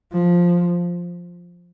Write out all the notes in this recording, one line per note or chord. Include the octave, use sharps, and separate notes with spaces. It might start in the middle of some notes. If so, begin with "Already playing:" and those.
F3